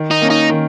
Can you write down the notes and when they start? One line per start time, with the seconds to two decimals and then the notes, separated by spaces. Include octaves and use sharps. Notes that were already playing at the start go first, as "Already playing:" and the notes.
Already playing: D#3
0.11 D#4
0.21 A#3 C#4
0.30 D#4
0.50 D#3